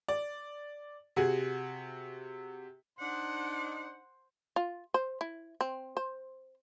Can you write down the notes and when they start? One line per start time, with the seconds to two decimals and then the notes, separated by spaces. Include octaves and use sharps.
0.08 D5
1.16 C3 F#4 G#4
3.00 D4 D#4 C5 F#5
4.56 F4
4.94 C5
5.21 E4
5.61 C4
5.97 C5